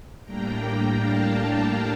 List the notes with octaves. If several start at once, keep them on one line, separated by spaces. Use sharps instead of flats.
A2 G3 A#3 D4 G5 A#5
G5 A#5
F5 A5